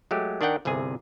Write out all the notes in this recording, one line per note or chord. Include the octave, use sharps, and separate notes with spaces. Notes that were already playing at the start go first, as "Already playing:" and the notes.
F#3 G#3 A3 G4
D#3 D4 A#4 F#5 G5
G1 C2 C3 G#4 G#5